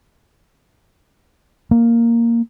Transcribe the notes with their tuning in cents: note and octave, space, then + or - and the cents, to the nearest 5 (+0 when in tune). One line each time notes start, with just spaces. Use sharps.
A#3 -5